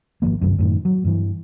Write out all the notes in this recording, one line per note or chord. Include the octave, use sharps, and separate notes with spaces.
G#1 F#2 F3 A#3
G1 C2 F#2
F#2 A2 D#3
F#3
G2 E3